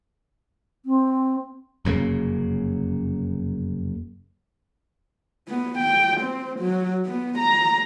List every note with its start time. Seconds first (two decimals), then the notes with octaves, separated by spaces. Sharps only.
0.86 C4
1.85 F1 F#2 C#3 A#3
5.48 B3
5.78 G5
6.20 C4
6.60 F#3
7.06 B3
7.38 A#5